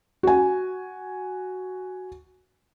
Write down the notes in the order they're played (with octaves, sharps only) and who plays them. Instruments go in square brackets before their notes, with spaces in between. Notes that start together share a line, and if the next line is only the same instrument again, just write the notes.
[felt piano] F#4 G#5